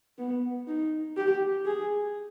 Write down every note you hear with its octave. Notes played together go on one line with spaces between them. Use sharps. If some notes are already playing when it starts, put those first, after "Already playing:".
B3
D#4
G4
G#4